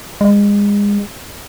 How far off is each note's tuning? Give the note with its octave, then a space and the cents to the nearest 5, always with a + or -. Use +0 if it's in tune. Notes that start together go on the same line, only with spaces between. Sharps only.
G#3 -30